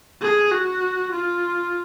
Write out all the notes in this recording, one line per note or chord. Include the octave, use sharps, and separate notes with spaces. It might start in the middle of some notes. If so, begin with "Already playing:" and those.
G#4
F#4
F4